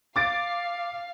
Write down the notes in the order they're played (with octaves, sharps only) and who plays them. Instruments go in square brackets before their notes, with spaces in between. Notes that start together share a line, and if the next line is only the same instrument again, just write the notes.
[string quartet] F5 [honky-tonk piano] D6 A6 D7